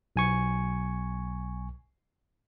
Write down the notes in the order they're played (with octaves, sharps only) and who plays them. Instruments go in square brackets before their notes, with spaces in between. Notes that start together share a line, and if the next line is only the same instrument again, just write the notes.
[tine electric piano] B1 G#5 C#6